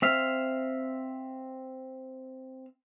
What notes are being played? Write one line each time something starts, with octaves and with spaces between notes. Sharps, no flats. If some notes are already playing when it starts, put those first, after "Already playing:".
C4 E5 F5